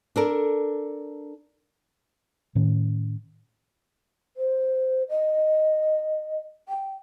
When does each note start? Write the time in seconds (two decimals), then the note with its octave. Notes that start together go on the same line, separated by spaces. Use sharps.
0.16 D4 A4 A#4
2.55 A2 D#3 C#4
4.37 C5
5.09 D#5
6.69 G5